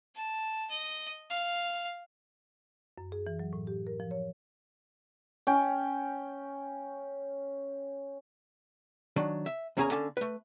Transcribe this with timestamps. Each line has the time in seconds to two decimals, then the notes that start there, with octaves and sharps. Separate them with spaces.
0.15 A5
0.70 D#5
1.30 F5
2.98 F#2
3.12 G#4
3.27 E3
3.39 F#3
3.53 A2
3.67 G4
3.87 A#4
4.00 F3
4.11 C#5
5.47 C#4 G5
9.16 D#3 F#3 D4
9.46 E5
9.77 E2 A#3 C#4 G#4 G#5 A#5
9.91 D3 A#3 C#4 A4
10.17 A3 B4